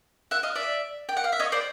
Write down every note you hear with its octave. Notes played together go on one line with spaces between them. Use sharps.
E5 F#5
D#5 F5
D5 E5
G5
F#5
F5
E5
C#5 D#5
C5 D5